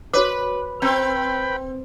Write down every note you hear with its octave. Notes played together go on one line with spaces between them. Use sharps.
F#4 B4 C#5 D6
C4 B4 G5 A#5 B5